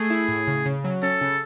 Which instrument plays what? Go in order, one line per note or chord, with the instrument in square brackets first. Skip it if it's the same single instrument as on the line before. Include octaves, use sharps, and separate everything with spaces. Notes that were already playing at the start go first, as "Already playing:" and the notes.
Already playing: [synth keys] A3 [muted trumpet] G#4
[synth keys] E4
A2
C#3
C#3
F#3
[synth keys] C#4 [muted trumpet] A4
[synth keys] C#3